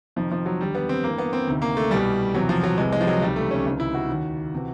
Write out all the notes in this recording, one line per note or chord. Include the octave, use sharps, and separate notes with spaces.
F2 C3 D#3 F3
F3
F#3
D#2 D3 G3
B3
C4
G2 E3 A#3
B3
C4
D2 C3 D#3
A#3
A3
C2 B2 G3
E2 C3 E3 F#3
F3
F#3
C2 C3 E3 G#3
G#3
F3
F#3
C#2 C3 D#3 G3
A3
C#4
C#2 C3 D#3
E4
F#4
D#2 D#3
C3 E3